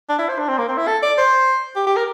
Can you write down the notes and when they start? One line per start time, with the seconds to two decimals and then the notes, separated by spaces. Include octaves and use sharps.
0.09 D4
0.19 E4
0.29 C5
0.39 D4
0.49 C4
0.58 A#3
0.68 C4
0.77 E4
0.87 A4
1.03 D5
1.18 C5
1.76 G4
1.87 G4
1.96 A#4